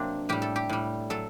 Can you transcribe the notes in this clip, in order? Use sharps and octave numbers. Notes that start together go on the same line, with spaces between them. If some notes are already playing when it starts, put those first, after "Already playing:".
Already playing: C3 F#3 A#3 C4 D4
A2 G3 G4
A4
G4
A2 G3
F#3 A4